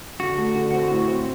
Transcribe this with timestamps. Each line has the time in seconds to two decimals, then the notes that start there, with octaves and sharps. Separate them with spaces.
0.20 D3 F#4
0.38 A3
0.55 D3
0.73 C4
0.90 A2
1.08 C4